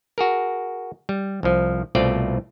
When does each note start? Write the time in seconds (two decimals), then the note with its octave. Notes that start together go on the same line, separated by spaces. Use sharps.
0.18 F#4 G#4 A#4
1.09 G3
1.43 C2 F3
1.95 C2 B2 A3 C4 F4 D5